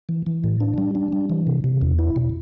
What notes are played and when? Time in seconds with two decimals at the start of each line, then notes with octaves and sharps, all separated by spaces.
0.09 E3
0.26 E3
0.44 A2
0.60 D4
0.78 G3
0.95 D4
1.12 G3
1.29 E3
1.47 C3
1.64 C3
1.81 E2
1.99 E4
2.16 B2